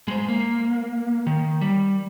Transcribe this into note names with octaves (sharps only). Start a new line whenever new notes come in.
G#3 C5
A#3
D#3
G3